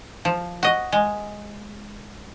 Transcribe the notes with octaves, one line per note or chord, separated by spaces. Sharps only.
F3
F#4 D#5
G#3